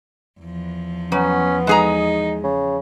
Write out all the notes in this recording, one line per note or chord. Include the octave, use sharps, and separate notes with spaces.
E2 F3
F#3 B3 C#4
G#3 D#4 G#4 A#5
C#3